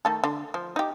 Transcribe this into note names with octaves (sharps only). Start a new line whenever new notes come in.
D#3 A3 A4
D3
F3
D#4 G4